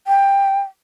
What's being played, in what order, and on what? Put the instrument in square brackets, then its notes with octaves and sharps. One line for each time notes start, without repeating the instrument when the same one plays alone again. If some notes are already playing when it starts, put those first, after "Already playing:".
[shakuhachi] G5